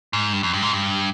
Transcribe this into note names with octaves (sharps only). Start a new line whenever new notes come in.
G#2
G2
F2
G2
G#2
G2